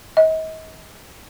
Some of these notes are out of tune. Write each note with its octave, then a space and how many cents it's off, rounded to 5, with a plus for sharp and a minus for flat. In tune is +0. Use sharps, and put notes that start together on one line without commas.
D#5 +40